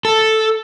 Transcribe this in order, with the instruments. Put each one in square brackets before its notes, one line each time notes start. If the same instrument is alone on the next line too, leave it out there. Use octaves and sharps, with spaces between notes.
[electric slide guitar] A4